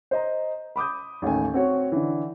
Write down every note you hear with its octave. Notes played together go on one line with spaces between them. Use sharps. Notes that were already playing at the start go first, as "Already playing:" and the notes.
C5 D#5 A#5
B5 D6 D#6 G6
A1 D#2 A3 G#5
C4 F#4 C#5
D3 E3